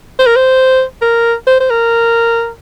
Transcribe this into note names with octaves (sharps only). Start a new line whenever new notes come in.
C5
A#4
C5
A#4
C5
C5
A#4